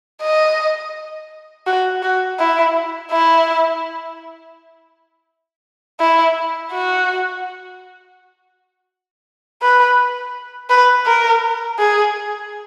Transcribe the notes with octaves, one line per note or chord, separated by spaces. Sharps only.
D#5
F#4
F#4
E4
E4
E4
F#4
B4
B4
A#4
G#4